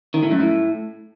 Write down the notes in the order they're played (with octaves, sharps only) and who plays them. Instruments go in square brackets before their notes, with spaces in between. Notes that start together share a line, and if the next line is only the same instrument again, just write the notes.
[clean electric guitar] D#3
A2
F#2
A2